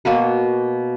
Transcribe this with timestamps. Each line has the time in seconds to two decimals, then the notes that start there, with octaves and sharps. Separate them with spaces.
0.05 B2 A#3 F#4 B4